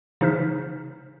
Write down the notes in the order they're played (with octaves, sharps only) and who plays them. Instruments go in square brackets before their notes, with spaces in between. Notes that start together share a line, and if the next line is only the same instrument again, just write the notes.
[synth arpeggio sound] C#3 E3 D#4 C5 F6 B6